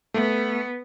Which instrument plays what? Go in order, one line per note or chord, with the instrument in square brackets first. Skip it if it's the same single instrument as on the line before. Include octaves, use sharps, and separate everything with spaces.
[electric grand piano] A3 [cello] B3